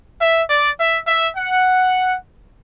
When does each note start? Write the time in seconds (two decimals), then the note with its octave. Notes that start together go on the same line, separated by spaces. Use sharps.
0.21 E5
0.49 D5
0.79 E5
1.07 E5
1.36 F#5